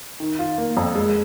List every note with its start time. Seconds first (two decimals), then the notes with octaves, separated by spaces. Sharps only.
0.20 D#3
0.39 F4
0.58 A#3
0.77 F2
0.95 G#3